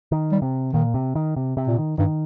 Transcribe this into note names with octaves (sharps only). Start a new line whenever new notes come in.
D#3
G3
C3
A#2 D#3
C3
D#3
C3
C3
A#2
D#3
G2 D#3